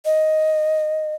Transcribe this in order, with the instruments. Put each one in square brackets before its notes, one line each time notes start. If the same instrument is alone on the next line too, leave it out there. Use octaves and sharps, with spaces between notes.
[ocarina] D#5